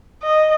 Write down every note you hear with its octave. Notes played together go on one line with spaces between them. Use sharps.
D#5